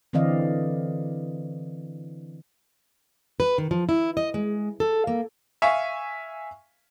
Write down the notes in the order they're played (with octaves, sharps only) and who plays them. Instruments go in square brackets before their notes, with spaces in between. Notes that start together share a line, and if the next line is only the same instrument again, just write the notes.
[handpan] D3 E3 C4 D5 D#5 F5
[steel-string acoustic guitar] B4
D#3
F3
E4
D#5
G#3
A4
A#3
[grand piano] E5 F5 G#5 C#6